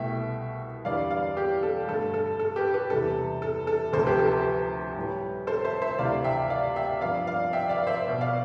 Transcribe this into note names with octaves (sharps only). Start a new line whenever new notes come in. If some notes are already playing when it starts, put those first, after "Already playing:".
Already playing: C2 B2 A3 E5 G5
E2 D3 G3 B3 D5 F5
D5 F5
G4
A4
G2 D3 A3 A4
A4
A4
G4 B4
G4 B4
E2 C3 G3 B3 A4
A4
A4
D2 C3 F3 B3 A4 C5
G4 B4
A4
G4 B4
A2 G3 B3
A4 C5
C5 E5
C5 E5
D2 C3 E3 A3 D5 F5
E5 G5
D5 F5
E5 G5
G2 F3 B3 D5 F5
D5 F5
E5 G5
D5 F5
C5 E5
B2 B3
D5 F5